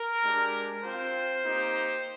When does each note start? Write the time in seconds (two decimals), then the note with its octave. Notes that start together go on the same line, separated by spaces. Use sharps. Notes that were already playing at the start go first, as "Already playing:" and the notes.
Already playing: A#4
0.23 G#3 D4 G4
0.84 C4 F4 C5
1.45 A#3 D#4 G4